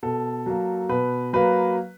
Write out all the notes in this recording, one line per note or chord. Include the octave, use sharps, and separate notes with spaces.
B2 A4
F#3 A#3
B2 B4
F#3 A#3 B4